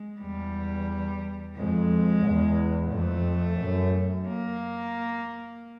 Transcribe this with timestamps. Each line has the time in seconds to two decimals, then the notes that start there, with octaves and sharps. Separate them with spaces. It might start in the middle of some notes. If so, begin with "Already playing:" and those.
Already playing: G#3
0.20 E2 G3
1.56 F2 G#3
2.23 E2
2.91 F2 A3
3.59 F#2
4.27 A#3